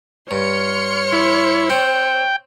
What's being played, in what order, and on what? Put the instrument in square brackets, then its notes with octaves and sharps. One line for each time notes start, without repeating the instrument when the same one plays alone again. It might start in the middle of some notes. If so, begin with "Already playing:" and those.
[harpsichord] G2 [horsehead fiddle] C#5 [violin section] C6 F6 C#7
[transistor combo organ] E4
[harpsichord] C4 [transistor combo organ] G5